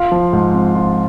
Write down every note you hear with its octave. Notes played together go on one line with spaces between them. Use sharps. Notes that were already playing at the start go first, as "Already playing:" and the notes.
Already playing: F4 F5
F3
G#2
C4
F4